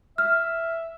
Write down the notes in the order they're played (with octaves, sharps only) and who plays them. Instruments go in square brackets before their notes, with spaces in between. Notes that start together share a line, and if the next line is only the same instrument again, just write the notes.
[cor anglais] E5 [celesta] F6